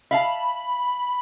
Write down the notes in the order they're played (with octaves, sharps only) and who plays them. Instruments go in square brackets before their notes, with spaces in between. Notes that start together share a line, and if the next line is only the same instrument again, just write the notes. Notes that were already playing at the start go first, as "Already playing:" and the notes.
[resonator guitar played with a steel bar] E5 F5 A5 [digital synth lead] B5